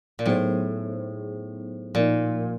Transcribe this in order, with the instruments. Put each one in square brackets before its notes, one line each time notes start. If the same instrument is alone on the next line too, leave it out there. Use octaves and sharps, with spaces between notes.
[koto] A#2
[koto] A2 [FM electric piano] F#3 B3 D#4 G#4 C5
[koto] A#2 [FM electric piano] F3 A#3 D#4